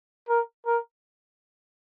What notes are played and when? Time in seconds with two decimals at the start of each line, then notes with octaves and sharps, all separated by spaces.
0.29 A#4
0.66 A#4